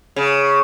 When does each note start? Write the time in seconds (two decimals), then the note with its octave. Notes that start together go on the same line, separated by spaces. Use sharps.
0.16 C#3